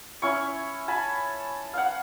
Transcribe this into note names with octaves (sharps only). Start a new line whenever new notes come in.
C#4 E4 C#6
G#5 A5 B5
F5 F#5